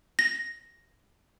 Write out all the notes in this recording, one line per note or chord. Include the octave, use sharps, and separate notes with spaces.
A#6